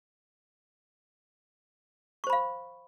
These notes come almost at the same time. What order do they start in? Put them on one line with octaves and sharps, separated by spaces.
C#6 C5 B5 F5